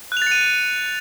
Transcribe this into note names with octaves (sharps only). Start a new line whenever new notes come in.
F#6 A6 C#7 D#7 F7